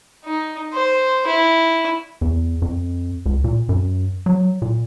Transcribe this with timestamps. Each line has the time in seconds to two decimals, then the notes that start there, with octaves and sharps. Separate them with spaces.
0.25 D#4
0.73 C5
1.27 E4
2.21 E2
2.62 F2
3.26 C#2
3.44 A#2
3.69 F#2
4.26 F#3
4.62 A#2